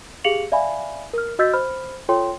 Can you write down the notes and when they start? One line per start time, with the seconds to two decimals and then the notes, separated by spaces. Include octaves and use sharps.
0.24 G4 G#4 F5 C#7 F7 F#7
0.52 D5 E5 F5 G#5 B5
1.13 A#4 F6
1.39 F#4 D#5 E6 G6 A6 B6
1.53 C5 B5 F6
2.09 F4 A4 C#5 G5 C6